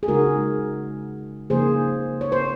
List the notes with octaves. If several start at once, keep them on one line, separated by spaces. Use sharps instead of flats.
G#4
C#3 G#3 D#4 F#4 A#4
C#3 F3 A#3 D#4 G#4 C5
C#5
C5